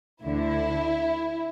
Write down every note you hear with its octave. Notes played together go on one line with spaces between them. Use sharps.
D2 D3 E4